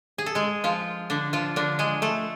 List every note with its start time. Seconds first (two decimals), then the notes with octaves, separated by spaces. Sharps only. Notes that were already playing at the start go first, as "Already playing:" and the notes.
0.18 G#4
0.26 A4
0.35 G#3 G#4
0.64 F3 F4
1.10 D3 D4
1.33 F3 F4
1.56 D3 D4
1.79 G#3 G#4
2.02 A3 A4